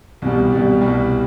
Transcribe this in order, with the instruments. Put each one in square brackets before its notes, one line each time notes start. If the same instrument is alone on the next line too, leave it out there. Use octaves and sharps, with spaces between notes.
[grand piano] C2 B2 G3
C2 B2 G3
C2 B2 G3